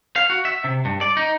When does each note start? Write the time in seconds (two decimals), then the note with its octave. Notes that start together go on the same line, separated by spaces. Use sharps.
0.16 F5
0.30 F#4
0.45 E5
0.64 C3
0.85 G2
1.01 D5
1.17 D#4